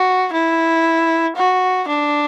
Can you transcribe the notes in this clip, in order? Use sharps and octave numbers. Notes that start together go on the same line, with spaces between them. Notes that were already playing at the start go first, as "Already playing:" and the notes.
Already playing: F#4
E4
F#4
D4